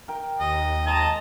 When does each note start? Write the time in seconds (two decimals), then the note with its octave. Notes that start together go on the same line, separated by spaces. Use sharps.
0.08 A#4 G5
0.40 D#2 D#5
0.87 G#3 D#5 A5 A#5